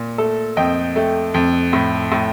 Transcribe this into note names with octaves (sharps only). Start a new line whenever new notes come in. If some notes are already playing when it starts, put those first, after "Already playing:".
Already playing: A#2
A3 A4
F2 D#5 G5
A3
F2
A2
A2